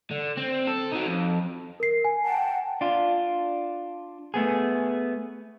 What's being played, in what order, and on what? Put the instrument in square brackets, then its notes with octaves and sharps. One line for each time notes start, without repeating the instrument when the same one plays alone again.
[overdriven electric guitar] D3
C4
A4
F#3 D#4
F2
[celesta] A#4 C7
G#5
[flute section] F#5 G5 A5
[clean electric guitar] D4 F4
A3 B3 G#4